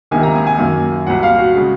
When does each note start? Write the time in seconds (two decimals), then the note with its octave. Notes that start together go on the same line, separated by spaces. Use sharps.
0.11 C#2 C3 D#3 A#3 G#5
0.23 A#5
0.35 G#5
0.47 G#5
0.59 F#2 D#3 A#3
1.07 C2 A#2 F#3 F#5
1.23 F5
1.39 F#4
1.55 C#3 G#3